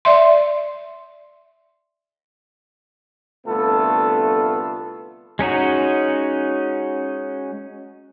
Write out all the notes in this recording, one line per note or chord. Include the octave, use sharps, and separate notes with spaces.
D5 E5 C6
C2 D3 A3 B3 F4 A4
G#3 C#4 D#4 F#4